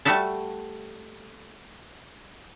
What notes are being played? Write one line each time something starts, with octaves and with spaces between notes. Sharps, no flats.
G3 A3 F#4 E5 A5